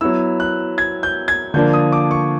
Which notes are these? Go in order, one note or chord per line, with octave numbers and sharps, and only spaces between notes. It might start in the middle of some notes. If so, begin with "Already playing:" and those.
F#3 B3 E4 E6
F#6
G#6
G6
G#6
D3 F3 A#3 D4 G6
D#6
D6
C#6